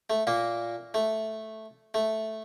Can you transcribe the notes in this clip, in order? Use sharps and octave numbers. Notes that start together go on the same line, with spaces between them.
A3
A#2 A#3
A3
A3